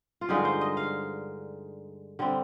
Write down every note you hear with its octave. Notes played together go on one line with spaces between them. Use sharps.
F4
G2 D3 G#3 D#4
C5
D#5
F5
D3 G3 C4